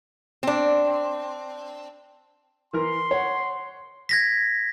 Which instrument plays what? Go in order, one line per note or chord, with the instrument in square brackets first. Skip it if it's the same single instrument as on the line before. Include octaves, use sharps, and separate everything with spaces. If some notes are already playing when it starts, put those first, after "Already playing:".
[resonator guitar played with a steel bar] C4 D4
[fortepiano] E3 A#4 [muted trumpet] C6
[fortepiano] C#5 F#5
[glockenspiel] G#6 A#6 B6